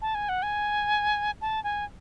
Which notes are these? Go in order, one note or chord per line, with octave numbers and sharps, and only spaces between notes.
A5
G#5
F#5
G#5
A5
G#5